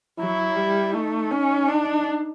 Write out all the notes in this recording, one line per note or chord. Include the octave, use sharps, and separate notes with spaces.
F#3 E4
G3
A3 D#4
C#4
D4